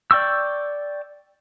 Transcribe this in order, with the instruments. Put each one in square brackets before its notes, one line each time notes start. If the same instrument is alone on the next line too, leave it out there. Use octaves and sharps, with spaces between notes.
[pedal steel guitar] D5 G5 C#6 E6